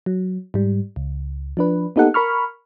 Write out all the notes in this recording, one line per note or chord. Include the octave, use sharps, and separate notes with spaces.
F#3
G#2 G3
C#2
F3 D4 B4
A#3 B3 D#4 G4 A4 F#5
A#4 B5 C#6 F6